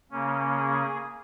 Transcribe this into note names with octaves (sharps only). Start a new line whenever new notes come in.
C#3 A#3 C#4
G#4